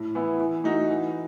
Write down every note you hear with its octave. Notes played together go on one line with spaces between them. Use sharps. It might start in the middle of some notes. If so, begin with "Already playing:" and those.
Already playing: A2
E3 B3 E4
E3
A3 D#4 F#4
E3